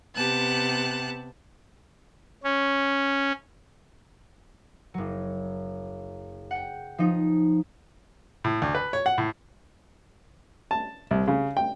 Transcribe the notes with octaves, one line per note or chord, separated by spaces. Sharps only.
C3 B3 G4 A5 F#6
C#4
F#1 F#3
F#5 G5
F3 D#4
A2
D2
B4
C#5
F#5
A2
A5
C2
C#3
G5